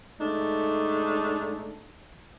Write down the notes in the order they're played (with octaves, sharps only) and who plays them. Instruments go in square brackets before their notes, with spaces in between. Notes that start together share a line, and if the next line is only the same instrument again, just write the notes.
[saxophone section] G#2 A3 D4 D#4